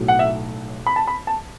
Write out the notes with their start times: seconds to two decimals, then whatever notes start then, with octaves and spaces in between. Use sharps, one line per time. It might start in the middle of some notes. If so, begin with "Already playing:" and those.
Already playing: B1 A2 F#3
0.08 F#5
0.19 E5
0.86 B5
0.96 A5
1.07 B5
1.27 A5